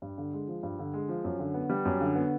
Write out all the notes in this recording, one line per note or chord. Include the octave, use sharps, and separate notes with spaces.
G2
D3
G#3
F3
G2
D3
G#3
F3
F#2
D3
B3
G3
F#2
D3
B3